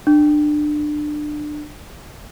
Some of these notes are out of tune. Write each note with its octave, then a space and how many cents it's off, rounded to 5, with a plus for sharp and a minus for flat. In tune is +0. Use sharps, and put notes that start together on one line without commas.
D4 +25